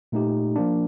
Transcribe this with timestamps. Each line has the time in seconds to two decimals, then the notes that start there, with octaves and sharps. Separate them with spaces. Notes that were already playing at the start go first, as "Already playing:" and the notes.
0.12 A#2 A3 D#4 G4
0.56 F3 A#3 D4